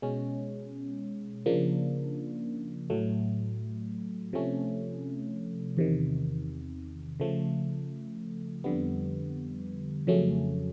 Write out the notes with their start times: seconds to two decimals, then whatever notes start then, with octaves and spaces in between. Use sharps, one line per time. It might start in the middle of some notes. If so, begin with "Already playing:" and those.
0.02 B2 G#3 C#4
1.46 C#3 F3 A#3 D4
2.90 A2 F#3 A3
4.33 C3 F3 A3 C#4
5.77 E2 C3 D#3
7.20 C#3 F3 A3
8.64 F2 D3 G3 B3
10.07 F2 C#3 F#3 A3 C#4